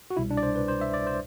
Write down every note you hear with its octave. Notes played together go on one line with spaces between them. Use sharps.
F#4
C2 B2 G3 E4
D4
D5
C5
B4
C5
E5
D5
C5